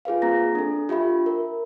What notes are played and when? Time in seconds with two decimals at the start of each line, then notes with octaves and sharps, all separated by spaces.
0.05 F4 G#4 B4 F5
0.22 A#3 C4 A#5 A#6
0.55 D4 A4
0.89 F4 G4 E5 B5
1.26 A#4